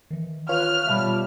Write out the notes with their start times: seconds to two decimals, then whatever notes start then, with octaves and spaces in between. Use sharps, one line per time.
0.11 D#3 E3
0.49 F4 B4 C#5 F6 F#6
0.87 B2 G3 E5 A5 B5